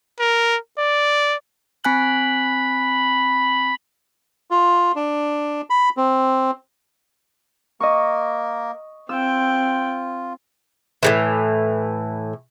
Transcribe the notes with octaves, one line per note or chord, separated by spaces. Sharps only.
A#4
D5
C4 G#5 B5 F#6
F4
D4
B5
C4
A#3 A#4 D#5 C#6
C4 F4 G5 E6
A2 C3 E3